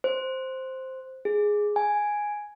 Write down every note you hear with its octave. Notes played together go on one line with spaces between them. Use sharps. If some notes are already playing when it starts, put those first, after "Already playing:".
C5
G#4
G#5